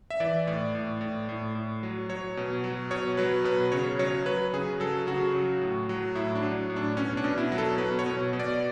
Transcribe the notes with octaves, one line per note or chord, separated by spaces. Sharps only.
E5
E3 D5
A2 D5
A2
A2
A2
A2
F#3
F#3 C#5
B2
F#3
B2 C#5
F#3 B4
B2 B4
C#3 C#5
F#3 C#5
F#3 B4
C#3 G#4
F#3 A4
C#3 F#4
F#3
A2
F#3
A2 E4
D4
F#3
A2
D4
B2 C#4
D4
B2
E4
F#3
A4
B2 B4
C#5
B2
B2
D5